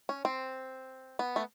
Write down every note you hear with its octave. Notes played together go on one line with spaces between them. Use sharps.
C#4
C4
B3
A3